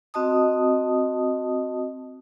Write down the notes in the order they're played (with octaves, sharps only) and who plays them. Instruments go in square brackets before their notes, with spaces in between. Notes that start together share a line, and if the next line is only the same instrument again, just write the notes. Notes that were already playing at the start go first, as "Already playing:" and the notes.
[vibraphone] C4 F#4 D#5 A5 D#6